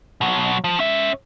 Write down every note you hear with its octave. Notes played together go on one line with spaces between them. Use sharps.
B2 F#3
F3
C#4 E5